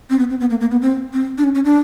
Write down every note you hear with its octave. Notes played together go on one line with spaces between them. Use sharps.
C4
B3
C4
B3
A#3
A#3
B3
C4
C4
D4
C#4
C#4
D4